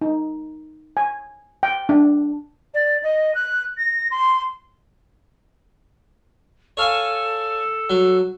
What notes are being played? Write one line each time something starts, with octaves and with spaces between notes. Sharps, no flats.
D#4
G#5
G5
D4
D5
D#5
F#6
A#6
C6
A4 C#5 F5 G#5
F#3